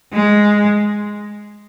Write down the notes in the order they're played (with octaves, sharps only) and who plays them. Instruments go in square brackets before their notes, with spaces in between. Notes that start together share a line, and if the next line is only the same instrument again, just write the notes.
[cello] G#3